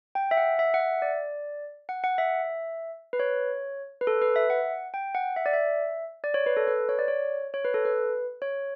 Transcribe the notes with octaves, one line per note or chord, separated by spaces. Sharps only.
G5
E5
F#5
E5
F#5
E5
D5
F#5
F#5
E5
B4
C#5
B4
A4
B4
E5
F#5
G5
F#5
E5
D5
E5
D5
C#5
B4
A4
B4
C#5
D5
C#5
C#5
B4
A4
B4
C#5